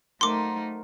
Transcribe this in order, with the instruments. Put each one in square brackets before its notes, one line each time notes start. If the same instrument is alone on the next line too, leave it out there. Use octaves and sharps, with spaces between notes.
[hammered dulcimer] F#3 A#4 C5 [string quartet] A3 A#3 D#4 [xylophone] C6 D6